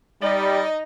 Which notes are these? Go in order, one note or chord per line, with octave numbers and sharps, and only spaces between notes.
G3 D#4 D5 D#5